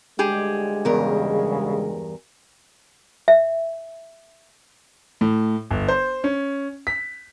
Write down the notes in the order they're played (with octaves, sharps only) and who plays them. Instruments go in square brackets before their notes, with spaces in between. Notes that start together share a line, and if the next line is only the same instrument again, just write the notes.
[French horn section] D2 G3 G#3 [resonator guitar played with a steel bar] G4 G#4
[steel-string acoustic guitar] E2 G2 A#4 [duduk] C#3
[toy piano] E5
[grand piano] A2
G1
C5
C#4
B6